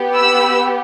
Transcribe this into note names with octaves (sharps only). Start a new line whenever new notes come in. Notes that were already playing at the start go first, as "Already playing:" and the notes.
Already playing: B3 G4
B5 E6